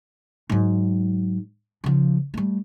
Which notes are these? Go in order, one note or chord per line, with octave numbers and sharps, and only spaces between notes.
G#2 F#3
C#3 F3
G3 A3